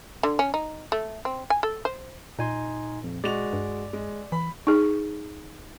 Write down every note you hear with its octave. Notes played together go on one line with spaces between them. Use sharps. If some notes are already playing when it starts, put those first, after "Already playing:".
D3
C#4
D#4
A3
C4
G#5
A4
C5
A#2 D#4 G#5 C6
F2
G#3 F#4 D5 F7
G2
G#3
E3 B5
D#4 G#4